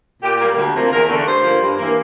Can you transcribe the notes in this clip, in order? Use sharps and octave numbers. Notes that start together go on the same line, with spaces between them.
A#2 G4
G3 A#3
D2
C3 F3 A#3
E2 A#4
D3 A3
G2 C5
F3 A#3
G2
E3 A#3